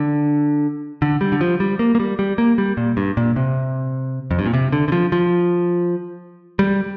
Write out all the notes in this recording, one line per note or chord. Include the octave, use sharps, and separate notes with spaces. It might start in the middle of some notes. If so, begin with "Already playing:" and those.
Already playing: D3
D3
G3
D3
F3
G3
A#3
A#3
G3
G3
A#3
G3
A#2
G2
A#2
C3
F2
G2
A#2
C3
D3
D3
F3
F3
G3